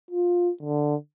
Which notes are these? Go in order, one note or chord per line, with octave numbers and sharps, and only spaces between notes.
F4
D3